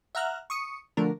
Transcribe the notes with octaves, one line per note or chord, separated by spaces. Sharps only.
E5 F#5 A#5 F6 F#6
C#6 D#6 C#7
D3 F3 A3 D4 A#4